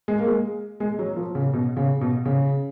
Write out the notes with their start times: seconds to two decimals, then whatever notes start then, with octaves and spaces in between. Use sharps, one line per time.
0.08 G#3
0.18 A#3
0.28 G#3
0.80 G#3
0.99 F#3
1.16 F3
1.35 C#3
1.53 B2
1.77 C#3
2.01 B2
2.26 C#3